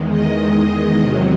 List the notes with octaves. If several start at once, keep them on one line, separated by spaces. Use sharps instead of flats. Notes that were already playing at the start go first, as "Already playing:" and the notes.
Already playing: E2 D#3 G#3
D#5
E2 C3 D#3 F#3